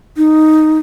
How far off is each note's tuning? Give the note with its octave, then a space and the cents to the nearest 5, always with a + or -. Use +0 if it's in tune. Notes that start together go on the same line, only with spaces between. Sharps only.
D#4 +0